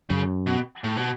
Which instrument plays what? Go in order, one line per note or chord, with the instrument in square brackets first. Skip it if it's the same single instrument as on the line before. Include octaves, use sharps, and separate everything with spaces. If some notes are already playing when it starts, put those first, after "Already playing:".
[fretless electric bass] F#2 [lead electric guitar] C#3
[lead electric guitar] B2
A2
B2